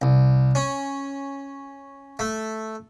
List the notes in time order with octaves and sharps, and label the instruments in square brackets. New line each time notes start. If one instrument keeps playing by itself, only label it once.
[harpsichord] C2
C#4
A3